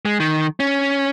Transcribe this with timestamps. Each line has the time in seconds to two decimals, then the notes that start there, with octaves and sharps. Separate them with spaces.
0.05 G#3
0.20 D#3
0.60 C#4